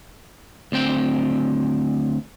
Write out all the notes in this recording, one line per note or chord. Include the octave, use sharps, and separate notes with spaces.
D2 C4 G5